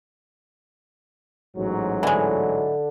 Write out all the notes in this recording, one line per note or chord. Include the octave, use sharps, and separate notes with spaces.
A1 G#2 F#3
D3 E3 G#3 D4